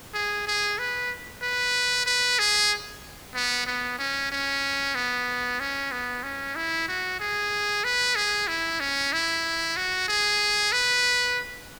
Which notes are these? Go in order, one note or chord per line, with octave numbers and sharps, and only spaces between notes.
G#4
G#4
B4
B4
B4
G#4
B3
B3
C#4
C#4
B3
C#4
B3
C#4
E4
F#4
G#4
B4
G#4
E4
C#4
E4
F#4
G#4
B4